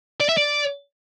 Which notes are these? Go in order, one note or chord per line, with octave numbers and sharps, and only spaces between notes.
D5
E5
D5